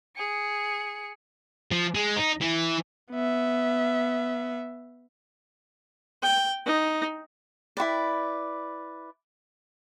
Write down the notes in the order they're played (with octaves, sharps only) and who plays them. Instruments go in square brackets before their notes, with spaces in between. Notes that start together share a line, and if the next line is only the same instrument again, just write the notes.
[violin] G#4 C#7
[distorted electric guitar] F3
G#3
D#4
E3
[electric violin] B3 E5
[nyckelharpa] G5
D#4
[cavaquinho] E4 F#4 B4 D5